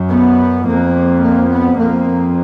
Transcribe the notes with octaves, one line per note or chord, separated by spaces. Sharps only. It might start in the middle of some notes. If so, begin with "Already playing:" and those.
Already playing: F#2
B3
F2 A#3
A#3
B3
F2 A#3